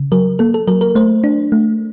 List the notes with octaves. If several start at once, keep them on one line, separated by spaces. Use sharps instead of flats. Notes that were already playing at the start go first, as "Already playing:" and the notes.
Already playing: C#3
F#3 A#4
A#3 A4
A4
F#3 A#4
A#4
A3 C5
D4
A3